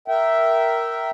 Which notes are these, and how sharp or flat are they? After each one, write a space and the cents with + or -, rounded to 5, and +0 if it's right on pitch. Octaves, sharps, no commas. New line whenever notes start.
A#4 +0 E5 +0 G5 -20